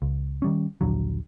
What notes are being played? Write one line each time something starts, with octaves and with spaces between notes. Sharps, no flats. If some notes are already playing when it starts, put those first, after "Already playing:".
C#2
D#3 G3 C#4
A#1 D#2 D3 F#3